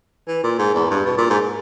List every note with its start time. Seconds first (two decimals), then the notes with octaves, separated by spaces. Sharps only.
0.28 E3
0.43 A#2
0.59 G#2
0.74 E2
0.90 G2
1.06 B2
1.18 A#2
1.30 G#2